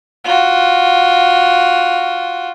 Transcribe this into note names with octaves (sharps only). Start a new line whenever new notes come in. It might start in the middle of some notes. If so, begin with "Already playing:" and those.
F4 F#4